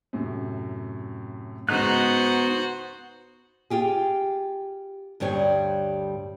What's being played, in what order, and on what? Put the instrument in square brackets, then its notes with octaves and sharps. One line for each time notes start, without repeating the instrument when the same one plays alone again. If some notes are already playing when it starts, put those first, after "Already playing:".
[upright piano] F#2 A2 C3
[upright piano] C#2 G#2 [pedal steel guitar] B3 D#4 F#6 [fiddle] F#4 C5
[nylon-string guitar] F4 G4 G#4
D2 G2 G3 C#5